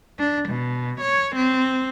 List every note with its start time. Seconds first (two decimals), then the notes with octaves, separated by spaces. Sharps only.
0.19 D4
0.49 B2
1.01 C#5
1.36 C4